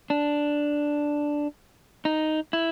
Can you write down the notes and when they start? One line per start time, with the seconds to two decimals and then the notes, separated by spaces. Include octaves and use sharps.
0.10 D4
2.05 D#4
2.53 E4